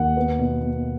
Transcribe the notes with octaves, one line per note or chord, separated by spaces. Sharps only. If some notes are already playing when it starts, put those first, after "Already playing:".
Already playing: D#2 F#5
B3
B2
B2